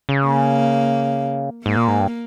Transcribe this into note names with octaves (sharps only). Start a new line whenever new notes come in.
C#3
A#3
G#2 A#3
A#2
G#2
G2